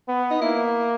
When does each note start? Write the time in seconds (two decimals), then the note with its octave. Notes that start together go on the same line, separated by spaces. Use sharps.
0.08 B3
0.31 D#4
0.41 A#3 E4